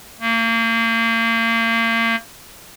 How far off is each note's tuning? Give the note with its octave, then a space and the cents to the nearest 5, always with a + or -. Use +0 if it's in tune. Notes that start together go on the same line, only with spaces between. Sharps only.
A#3 -35